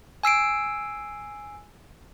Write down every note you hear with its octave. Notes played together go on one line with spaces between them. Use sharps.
G#5 E6 C7 D7